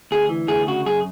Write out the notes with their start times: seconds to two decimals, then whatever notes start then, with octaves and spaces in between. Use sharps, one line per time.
0.11 D2 G#4
0.29 E3
0.48 D2 G#4
0.67 C#3 F#4
0.86 F#2 G#4